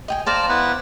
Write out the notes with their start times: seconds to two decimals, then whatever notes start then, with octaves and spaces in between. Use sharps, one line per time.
0.08 D#5 G5 G#5
0.26 C5 D5 F5 A5 A#5
0.49 B3 E4 B4